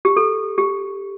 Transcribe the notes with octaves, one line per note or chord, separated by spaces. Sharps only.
G4
A4
G4